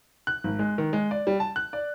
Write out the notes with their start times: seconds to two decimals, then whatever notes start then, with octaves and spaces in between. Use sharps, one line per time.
0.27 F#6
0.44 G#1
0.59 G#3
0.78 D#3
0.93 G#3
1.11 D5
1.27 G3
1.40 A5
1.56 F#6
1.73 D5